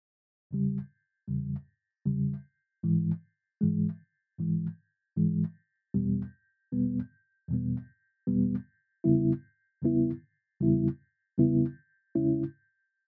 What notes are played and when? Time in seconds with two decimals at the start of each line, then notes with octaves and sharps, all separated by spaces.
0.51 E2 C#3 G3
1.28 E2 C#3 G3
2.05 E2 C#3 G3
2.83 G#2 E3 G#3
3.61 G#2 E3 G#3
4.39 G#2 E3 G#3
5.16 G#2 E3 G#3
5.94 E2 B2 G3 B3
6.72 E2 B2 G3 B3
7.49 E2 B2 G3 B3
8.27 E2 B2 G3 B3
9.04 E2 C#3 G3 B3 E4
9.82 E2 C#3 G3 B3 E4
10.60 E2 C#3 G3 B3 E4
11.38 E2 C#3 G3 B3 E4
12.15 E2 C#3 G#3 C#4 E4